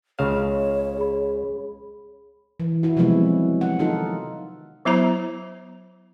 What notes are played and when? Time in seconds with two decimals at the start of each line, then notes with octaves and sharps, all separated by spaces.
0.19 C#2 C#3 C#5 F5 E7
0.97 G#4 B5
2.60 E3
2.83 E4 F#4
2.97 C3 F3 F#3 G#3 B3 E4
3.61 F#5
3.79 D#3 D#4 F4 A4
4.85 F#3 B3 E4 C5 A#5